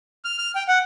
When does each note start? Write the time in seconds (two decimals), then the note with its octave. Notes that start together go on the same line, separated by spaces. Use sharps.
0.25 F6
0.38 F6
0.55 G5
0.68 F#5